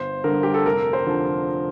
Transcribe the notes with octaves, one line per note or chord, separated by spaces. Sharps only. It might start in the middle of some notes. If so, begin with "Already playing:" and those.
Already playing: G1 C5
G2 D3 A#4
G4
A4
F1 A#4
C5
D3 F3